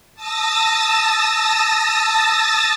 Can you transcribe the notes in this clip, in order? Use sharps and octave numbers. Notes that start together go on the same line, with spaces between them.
A5 D#6 E6 A6 A#6